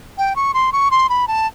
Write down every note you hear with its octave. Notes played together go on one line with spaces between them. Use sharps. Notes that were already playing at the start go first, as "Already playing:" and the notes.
G5
C#6
C6
C#6
C6
B5
A5